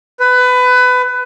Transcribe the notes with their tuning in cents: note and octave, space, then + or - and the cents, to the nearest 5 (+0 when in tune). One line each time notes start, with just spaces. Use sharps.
B4 +20